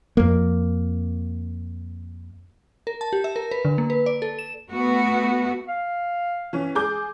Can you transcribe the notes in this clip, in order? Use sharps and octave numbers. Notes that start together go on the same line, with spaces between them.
F2 A#3
A#4
A5
G4
E5
A#4
B4
D3
A#3
B4
D5
A4
E7
A3 B3 F#4
F5
E3 C#4
G#4 D6 G6